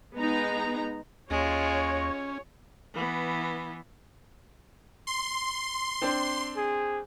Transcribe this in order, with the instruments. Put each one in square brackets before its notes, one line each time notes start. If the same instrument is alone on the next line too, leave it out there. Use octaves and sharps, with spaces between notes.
[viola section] G#3 B3 D#4 A#5
[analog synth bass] D#2 [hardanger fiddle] G#3 F4 [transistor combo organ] C#4 [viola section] C#5
[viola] E3 B3
[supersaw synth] C6
[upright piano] C4 D4 C5
[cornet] G#4